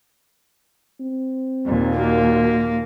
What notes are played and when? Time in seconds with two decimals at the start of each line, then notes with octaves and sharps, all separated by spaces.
1.01 C4
1.65 D#2 A#2
1.97 A#3 F#4